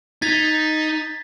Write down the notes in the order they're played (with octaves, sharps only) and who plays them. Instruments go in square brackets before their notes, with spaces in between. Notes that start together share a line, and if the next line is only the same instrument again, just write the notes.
[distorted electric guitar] D#4 [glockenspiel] G#6 A6 B6